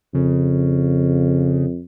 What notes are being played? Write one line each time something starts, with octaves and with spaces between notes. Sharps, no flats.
F2 C#3